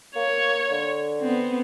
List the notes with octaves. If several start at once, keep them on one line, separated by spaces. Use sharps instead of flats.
A#3 C#5
D3
B3 C4